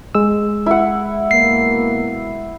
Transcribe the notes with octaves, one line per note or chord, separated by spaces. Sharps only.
G#3 E6
E4 F#5
B2 A#3 C7